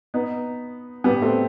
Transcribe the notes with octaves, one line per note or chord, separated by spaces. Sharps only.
B3 D#4
G3 B3
A3 C4